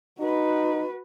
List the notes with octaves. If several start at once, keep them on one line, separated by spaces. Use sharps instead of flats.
D#4 F#4 B4